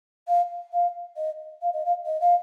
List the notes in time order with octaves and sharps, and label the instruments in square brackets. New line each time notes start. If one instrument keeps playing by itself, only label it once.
[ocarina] F5
F5
D#5
F5
D#5
F5
D#5
F5